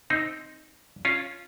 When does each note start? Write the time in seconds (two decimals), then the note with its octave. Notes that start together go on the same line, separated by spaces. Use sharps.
0.10 C4 D#4
1.05 C#4 F4